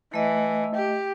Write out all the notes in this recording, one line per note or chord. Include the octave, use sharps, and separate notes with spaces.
E3 A3 D#5
G4